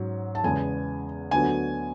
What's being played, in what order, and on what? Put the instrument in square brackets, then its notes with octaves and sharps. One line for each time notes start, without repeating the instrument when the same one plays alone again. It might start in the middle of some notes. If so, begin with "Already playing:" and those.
Already playing: [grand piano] G#2 F#3 C#4 F#4
[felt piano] A5
[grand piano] E2 C#3 G#3 B3 [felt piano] G#5
[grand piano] D2 D3 F#3 B3 F#4 [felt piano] G#5